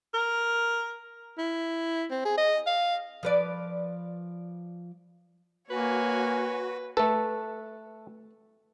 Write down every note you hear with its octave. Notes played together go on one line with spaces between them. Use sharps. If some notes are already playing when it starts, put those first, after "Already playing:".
A#4
E4
C4
G#4
D#5
F5
F3 B4 D5
A#3 F#4 B4 C#5 G#5
A3 A4 B4